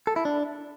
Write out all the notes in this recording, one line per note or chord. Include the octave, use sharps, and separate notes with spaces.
A4
E4
D4